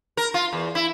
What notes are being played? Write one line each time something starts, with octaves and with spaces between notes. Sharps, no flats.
A#4
F4
E2
E4